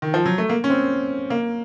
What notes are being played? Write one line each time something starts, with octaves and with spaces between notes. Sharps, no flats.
D#3
F3
F#3
A3
A#3
C#4
C4
A#3